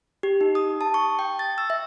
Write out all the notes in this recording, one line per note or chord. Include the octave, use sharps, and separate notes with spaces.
G4
D#4
D#6
A5
C#6
G5
A6
E6
E5